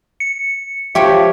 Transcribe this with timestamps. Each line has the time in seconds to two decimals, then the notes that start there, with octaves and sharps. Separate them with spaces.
0.20 C#7
0.95 F3 G4 C#5 E5 G5